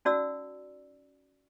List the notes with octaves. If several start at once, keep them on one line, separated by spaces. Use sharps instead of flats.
C#4 D#4 F#4 D5 F#5 E6